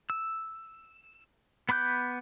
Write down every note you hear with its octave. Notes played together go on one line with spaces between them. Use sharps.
E6
B3 B5 D6 F#6 G6